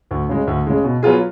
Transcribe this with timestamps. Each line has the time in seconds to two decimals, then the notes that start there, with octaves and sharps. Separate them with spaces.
0.11 D2
0.29 C#3 G#3
0.47 D2
0.67 C#3 G#3
0.84 B2
1.03 F#3 B3 F4 G#4